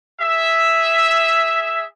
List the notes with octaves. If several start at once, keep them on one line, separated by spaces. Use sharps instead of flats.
G#4 E5